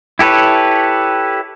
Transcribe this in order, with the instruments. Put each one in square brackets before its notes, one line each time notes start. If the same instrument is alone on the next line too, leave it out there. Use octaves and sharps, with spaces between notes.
[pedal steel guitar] E4 G4 A4 B4 C#5